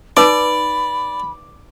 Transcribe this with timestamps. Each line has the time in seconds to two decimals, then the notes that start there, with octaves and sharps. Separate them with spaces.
0.17 D#4 B4 D5 B5 D6